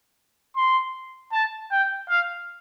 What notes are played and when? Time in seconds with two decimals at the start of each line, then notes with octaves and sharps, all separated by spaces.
0.56 C6
1.32 A5
1.71 G5
2.09 F5